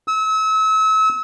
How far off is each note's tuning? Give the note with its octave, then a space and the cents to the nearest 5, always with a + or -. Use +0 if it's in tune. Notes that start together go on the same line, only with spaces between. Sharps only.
E6 -35